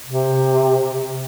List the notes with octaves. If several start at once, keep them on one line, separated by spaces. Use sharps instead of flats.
C3